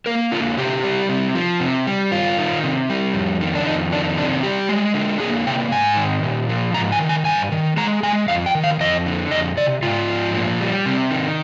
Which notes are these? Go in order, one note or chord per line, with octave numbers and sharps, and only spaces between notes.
A#3 A#4
D3 F4
C3 G4
G3
C3
F3
C3
G3
G2 F4
D#3
C3
G3
F2
D#3
D4
F2 D#4
D#3 D4
C3 D4
G3 G4
G#3
D3
A#3 G#4
C3 G5
G#2 G#5
D#3
A#2
F3
G#2 A#5
G#5
D#3
G#5
G2 G#5
D#3
G#3 A#5
G#3 G#5
F2 F5
G5
D#3
F5
F2 D#5
D3
F2 D#5
C3 D5
G#2 F4
F3
A#2
G3
C3
D#3